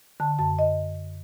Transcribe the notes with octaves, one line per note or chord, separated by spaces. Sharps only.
D3 A5
F#2 A5
D#5